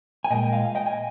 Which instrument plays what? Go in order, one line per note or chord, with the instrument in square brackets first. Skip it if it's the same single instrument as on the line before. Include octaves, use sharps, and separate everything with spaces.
[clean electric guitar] G#5
A#2 G#3 D#5 G5
F5 G#5
D#5 G5
G#5